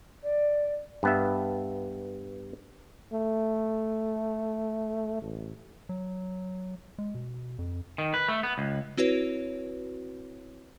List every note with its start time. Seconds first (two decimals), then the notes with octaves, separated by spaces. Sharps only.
0.23 D5
1.03 G2 B3 E5
3.12 A3
5.22 A1
5.89 F#3
6.98 G#3
7.15 B2
7.58 F2
7.98 D#3
8.14 B4
8.28 A3
8.43 B3
8.58 C#2
8.97 C4 E4 F#4 B4 C#5